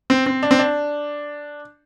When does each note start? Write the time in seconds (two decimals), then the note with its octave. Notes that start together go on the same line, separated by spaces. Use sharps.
0.10 C4
0.26 C4
0.43 D4
0.51 C4
0.59 D4